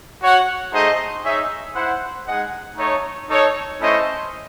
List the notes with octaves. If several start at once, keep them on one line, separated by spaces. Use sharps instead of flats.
F#4 C#5 F#5
A3 D#4 G#4 C5 D#5
D#4 G#4 C#5 E5
E4 C5 F#5
G#3 D#4 G#4 D#5 F#5
A3 D#4 A4 C#5
D#4 A4 C#5
A3 C#4 E4 C5 D#5